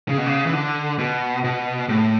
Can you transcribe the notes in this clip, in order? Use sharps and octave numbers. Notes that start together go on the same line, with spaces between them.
C#3
B2
C#3
E3
D3
B2
B2
A2